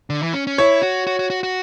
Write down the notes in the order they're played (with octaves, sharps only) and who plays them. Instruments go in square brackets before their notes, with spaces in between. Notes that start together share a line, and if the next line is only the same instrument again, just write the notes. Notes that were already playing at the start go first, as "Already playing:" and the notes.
[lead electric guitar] D3
E3
C#4
C#4
[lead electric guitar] E4 [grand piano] C#5
[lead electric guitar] F#4
F#4
F#4
F#4
F#4